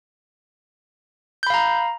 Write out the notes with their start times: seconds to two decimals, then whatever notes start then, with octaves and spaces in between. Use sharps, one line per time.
1.43 G6
1.47 B5
1.50 F5
1.54 A#5